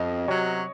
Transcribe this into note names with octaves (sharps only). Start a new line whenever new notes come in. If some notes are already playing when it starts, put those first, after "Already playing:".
Already playing: F2 D#5
C3 F#3 C#5